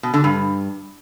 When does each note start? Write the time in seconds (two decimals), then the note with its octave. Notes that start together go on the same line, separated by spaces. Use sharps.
0.03 B2
0.14 D3
0.24 G2